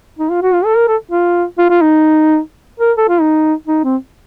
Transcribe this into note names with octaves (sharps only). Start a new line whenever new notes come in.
D#4
F4
F#4
F4
A4
A#4
A4
F4
F4
F4
D#4
A#4
A4
F4
D#4
D#4
C4